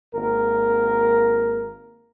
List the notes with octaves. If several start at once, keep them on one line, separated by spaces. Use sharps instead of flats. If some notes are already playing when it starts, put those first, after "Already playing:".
G#1 A#3 A#4